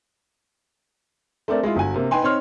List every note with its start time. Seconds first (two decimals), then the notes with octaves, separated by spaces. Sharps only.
1.48 A3 C4 D4 A#4 D5
1.63 G#3 E4 F4
1.76 G1 F#4 G#5
1.94 C3 A#3
2.11 D#4 B4 G5 G#5 C6
2.22 C4 D#4 C#5 C6 F6